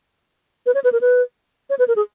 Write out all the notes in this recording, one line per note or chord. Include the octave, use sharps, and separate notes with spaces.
B4
C#5
B4
A#4
B4
C#5
B4
A#4
G#4